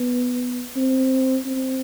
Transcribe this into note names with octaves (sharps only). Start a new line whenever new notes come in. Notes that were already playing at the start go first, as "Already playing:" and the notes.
Already playing: B3
C4
C4